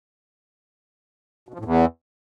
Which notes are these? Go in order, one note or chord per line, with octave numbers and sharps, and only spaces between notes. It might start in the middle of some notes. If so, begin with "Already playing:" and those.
B2
F3
A2
E2